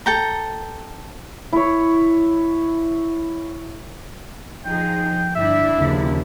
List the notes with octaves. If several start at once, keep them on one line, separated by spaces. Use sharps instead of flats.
A4 G5 A#5
E4 C#5
F3 D#4 G#4 G5
G1 D4 E4 E5
D#2 C#3 F3